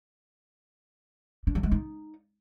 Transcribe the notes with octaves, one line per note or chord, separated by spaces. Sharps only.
D4
F#3
G#3
D#4